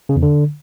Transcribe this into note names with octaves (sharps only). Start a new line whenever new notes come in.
C#3
E2
D3